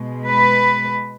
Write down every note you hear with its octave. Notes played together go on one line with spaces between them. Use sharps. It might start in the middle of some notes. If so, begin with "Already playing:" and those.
Already playing: B2 G#3
B4